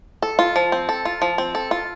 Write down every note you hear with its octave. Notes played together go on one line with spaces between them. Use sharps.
A4
F4
F3
C4
A4
F4
F3
C4
A4
F4